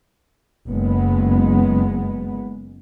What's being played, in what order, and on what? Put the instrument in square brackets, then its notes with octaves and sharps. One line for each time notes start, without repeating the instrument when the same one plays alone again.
[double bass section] F#1 G#3 B3